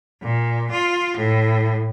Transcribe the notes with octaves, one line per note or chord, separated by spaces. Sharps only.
A#2
F4
A2